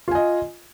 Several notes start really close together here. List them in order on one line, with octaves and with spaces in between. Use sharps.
F4 G#5 D#5